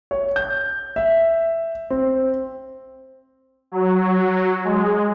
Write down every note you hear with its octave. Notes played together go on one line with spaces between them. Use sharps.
C#5
G6
E5
C4
F#3
G#3